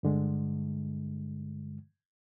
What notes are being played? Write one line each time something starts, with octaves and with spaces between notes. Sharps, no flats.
G2 D3 G#3